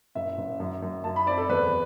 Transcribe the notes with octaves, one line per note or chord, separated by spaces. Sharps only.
F#1 E5
F#1
F#2
F#2
F#2 A5
B5
C4 D5
A4
E2 B4